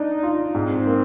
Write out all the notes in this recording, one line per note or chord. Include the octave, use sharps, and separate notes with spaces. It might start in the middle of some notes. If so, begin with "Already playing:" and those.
Already playing: D4 D#4
F4
G#2 C4
A#3